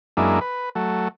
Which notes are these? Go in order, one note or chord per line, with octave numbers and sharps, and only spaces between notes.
F#2 G#3 A#3 D4 E4
B4
F#3 A3